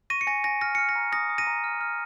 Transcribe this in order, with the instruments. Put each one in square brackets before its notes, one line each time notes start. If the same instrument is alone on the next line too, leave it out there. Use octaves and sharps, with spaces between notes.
[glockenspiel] C#6 A#6 D#7
C#7
G#5 A#6
G#5 A#6
F6 A#6
F6 C#7
A#6
A#5
D#6 A#6
D#6
A#6 D#7
A#5
F6
F6